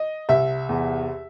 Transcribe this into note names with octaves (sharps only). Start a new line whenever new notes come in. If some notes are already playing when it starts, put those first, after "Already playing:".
Already playing: D#5
C2 E5
E2